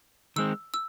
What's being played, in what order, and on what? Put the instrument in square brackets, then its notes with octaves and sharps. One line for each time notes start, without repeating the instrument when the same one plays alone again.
[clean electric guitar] D#3 G#3 C4 [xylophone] E6
[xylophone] E6